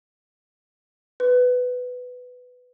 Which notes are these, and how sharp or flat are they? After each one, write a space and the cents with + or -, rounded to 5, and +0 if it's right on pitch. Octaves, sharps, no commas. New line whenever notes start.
B4 +10